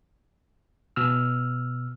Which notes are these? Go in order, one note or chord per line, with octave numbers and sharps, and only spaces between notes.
B2 E6 F6